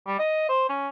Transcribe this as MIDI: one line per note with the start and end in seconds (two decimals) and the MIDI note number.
0.07 0.17 55
0.19 0.48 75
0.49 0.64 72
0.69 0.88 61